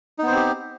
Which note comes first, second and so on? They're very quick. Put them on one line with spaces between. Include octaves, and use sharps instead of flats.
D#4 B3 C5 C4 G4